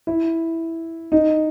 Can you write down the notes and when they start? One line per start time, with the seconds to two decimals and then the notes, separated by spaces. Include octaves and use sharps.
0.07 E4
1.12 D#4